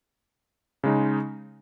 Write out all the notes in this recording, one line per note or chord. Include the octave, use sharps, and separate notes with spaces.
C#3 G#3 D#4